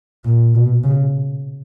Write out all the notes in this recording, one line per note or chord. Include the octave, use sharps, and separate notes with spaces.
A#2
B2
C#3